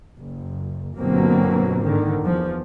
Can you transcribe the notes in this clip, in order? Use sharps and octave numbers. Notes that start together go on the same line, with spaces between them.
F#1
G1 B2 D3 F#3 A#3 C4
G#2 D3 D#3
E2 F3